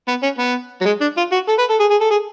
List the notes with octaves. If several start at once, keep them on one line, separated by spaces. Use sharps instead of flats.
B3
C#4
B3
F#3
G#3
D4
F4
F#4
A4
B4
A4
G#4
G#4
A4
G#4